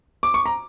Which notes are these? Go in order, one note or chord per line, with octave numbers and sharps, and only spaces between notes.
D6
C#6
A#5